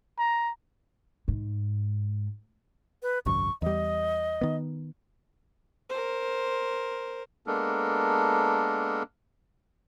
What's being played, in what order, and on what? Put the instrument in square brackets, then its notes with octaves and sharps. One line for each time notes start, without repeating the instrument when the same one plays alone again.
[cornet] A#5
[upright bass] G#2
[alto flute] B4
[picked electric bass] G#1 C#2 F#2 [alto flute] C#6
[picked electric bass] E2 G3 [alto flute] D#5
[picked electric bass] D#3 B3
[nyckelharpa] A#4 C5
[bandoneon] G#3 A#3 B3 D4 A4 A#4